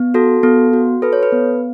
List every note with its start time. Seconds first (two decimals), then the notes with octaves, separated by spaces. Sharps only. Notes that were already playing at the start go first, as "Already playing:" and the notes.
Already playing: B3
0.14 F#4 A4
0.43 B3 A4
0.73 F#4
1.02 A4 B4
1.13 C#5
1.23 B4
1.32 B3